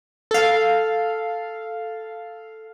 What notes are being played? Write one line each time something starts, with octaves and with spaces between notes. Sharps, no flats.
A4 F5